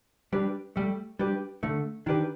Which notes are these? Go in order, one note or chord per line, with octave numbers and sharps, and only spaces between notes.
G3 D4 G4 B4
G3 A3
G3 D4 G4 B4
D3 A3
D#3 D4 G4 B4